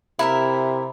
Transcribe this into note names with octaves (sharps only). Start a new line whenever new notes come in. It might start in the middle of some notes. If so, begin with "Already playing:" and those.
C3 E4 A#4 E5